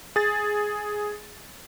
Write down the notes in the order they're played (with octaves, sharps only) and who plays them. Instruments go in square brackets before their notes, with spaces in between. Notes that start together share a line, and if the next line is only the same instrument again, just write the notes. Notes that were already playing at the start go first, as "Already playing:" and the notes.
[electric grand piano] G#4 A6